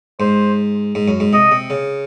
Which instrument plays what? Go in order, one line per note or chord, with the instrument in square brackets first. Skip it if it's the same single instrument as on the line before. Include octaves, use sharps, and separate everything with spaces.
[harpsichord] G#2 [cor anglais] C5
[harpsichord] G#2
F#2
G#2
[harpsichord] C3 [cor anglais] D#5
[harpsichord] C3
C#3